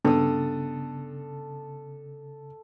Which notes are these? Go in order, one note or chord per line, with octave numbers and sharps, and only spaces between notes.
G2 C#3 B3 A4 D#6